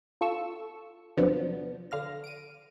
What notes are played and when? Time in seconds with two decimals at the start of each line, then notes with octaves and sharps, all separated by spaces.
0.21 F4 A4 C#6 E6
1.17 E2 C3 F3 F#3 B3 D4
1.91 D3 F5 F6 A#6
2.24 D7 D#7